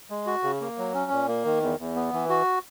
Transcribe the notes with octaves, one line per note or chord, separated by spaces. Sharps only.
G#3
F#4
C#3
A#3
F#3
C#4
A#2
A#3
D#3
E2
E2
B3
E3
F#4